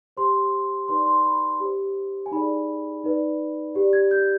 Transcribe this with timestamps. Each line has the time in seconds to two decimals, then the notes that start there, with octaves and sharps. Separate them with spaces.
0.17 G4 C5 C6
0.88 D#4 B4 D5 C6
1.06 C6
1.25 B5
1.60 G4 C5
2.26 G#5
2.32 D#4 G#4 D5 B5
3.04 D#4 B4 D5
3.75 G4 D5
3.93 G#6
4.11 G6